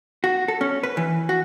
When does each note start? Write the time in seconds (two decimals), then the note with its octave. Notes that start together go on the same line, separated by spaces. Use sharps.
0.24 F#4
0.48 A4
0.61 C#4
0.83 B4
0.97 E3
1.29 F#4